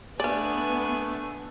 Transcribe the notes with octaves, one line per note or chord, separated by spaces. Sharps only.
A3 B3 D4 D5 F5 G#5